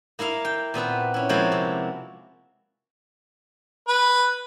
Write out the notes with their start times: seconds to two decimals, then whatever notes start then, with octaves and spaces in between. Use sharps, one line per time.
0.19 A#3 E4 A#4 F5
0.45 G5
0.74 A#2 B3 C4 B4
1.14 C#4 E4
1.29 F3 G#3 A#3 C4 E4 F#4
1.52 C3
3.88 B4